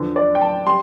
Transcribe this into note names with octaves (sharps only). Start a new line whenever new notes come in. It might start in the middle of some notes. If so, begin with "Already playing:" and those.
Already playing: E2 D3 F3
D5
G5
A5
G3 C6